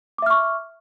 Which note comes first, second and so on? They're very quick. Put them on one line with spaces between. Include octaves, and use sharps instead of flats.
D6 E5 F6 C#6